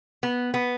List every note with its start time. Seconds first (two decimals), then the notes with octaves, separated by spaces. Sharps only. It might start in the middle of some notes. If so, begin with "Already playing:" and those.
0.23 B3
0.54 B3